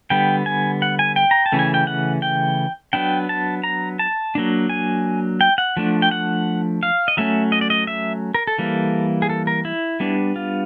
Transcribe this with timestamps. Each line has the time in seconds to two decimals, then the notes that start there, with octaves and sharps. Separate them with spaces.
0.10 D3 G3 B3 G5
0.46 G#5
0.82 F#5
0.99 G#5
1.16 G5
1.31 A#5
1.46 A5
1.52 C#3 E3 A3 C#4
1.59 G#5
1.74 G5
1.87 F#5
2.22 G5
2.93 F#3 B3 D4 G5
3.29 A5
3.63 A#5
3.99 A5
4.35 F#3 A#3 D4
4.69 G#5
5.41 G5
5.58 F#5
5.77 F3 A3 D4
6.02 G5
6.11 F#5
6.83 F5
7.08 D#5
7.17 F#3 A3 C#4 E5
7.52 D#5
7.61 D5
7.70 D#5
7.87 E5
8.34 A#4
8.47 A4
8.59 E3 G3 A#3
9.22 G#4
9.30 A4
9.47 A#4
9.65 E4
10.00 G3 B3 D4
10.36 F4